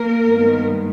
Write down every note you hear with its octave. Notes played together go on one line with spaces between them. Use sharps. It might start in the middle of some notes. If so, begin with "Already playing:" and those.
Already playing: A#3 A#4
G2 D#3 G#3 B3